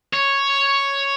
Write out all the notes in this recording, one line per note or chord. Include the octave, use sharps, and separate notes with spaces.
C#5